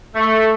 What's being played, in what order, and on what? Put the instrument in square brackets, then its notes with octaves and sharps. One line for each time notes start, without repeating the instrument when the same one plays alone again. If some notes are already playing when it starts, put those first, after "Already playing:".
[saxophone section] A3